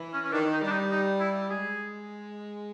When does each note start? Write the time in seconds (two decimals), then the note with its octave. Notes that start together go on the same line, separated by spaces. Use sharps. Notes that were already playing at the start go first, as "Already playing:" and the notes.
Already playing: E3
0.13 C#4
0.24 C#4
0.32 D#3 D4
0.52 D#4
0.62 G3
0.67 D4
0.71 D#4
0.91 D#4
1.20 E4
1.50 G#3 G#4